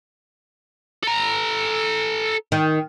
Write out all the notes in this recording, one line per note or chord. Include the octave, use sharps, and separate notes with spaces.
A4 A#5
D#3